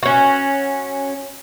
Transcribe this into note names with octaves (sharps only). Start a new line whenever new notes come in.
C#4 F#4